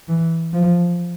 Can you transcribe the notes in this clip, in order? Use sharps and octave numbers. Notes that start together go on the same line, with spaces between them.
E3
F3